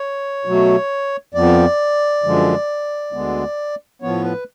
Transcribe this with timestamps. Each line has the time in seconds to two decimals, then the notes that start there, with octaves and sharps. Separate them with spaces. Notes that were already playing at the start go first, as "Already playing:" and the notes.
Already playing: C#5
0.45 B2 F#3 A3
1.34 F2 F3 B3 D5
2.24 F#2 D3 F3 G#3
3.13 D2 D3 G#3 B3
4.02 A2 F3 B3 C#5
4.24 B4